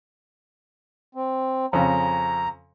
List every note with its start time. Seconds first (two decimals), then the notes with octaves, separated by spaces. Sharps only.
1.15 C4
1.73 F2 C#3 C#4 A#5